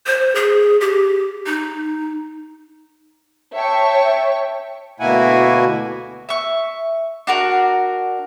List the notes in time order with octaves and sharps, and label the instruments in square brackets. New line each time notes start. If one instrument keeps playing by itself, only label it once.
[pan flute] C5
G#4
G4
D#4
[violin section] C#5 E5 G5 A5 C#6
[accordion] D2 B2 A#3 E4 F#4 G#5
[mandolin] E5 C#6
D4 F#4 A#4